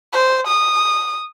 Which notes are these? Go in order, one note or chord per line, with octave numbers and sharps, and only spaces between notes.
C5
D#6